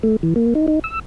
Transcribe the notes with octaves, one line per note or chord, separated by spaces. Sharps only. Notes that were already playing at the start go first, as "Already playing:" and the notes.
A3
E3
A#3
D#4
D#4
E6